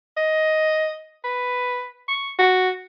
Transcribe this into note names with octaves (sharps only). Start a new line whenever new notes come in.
D#5
B4
C#6
F#4